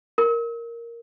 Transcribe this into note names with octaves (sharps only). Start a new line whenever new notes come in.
A#4